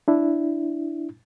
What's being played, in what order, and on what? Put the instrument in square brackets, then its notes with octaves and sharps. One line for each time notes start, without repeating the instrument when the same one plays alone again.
[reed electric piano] D4 E4